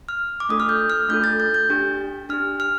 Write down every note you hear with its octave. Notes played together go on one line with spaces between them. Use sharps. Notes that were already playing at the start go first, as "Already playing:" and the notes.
F6
D6
A3 D4 F4 A4 D#6
F6
G6
F6
A3 D4 F4 A4 G6
A6
G6
G6
D4 G4
D4 G4 F6
F6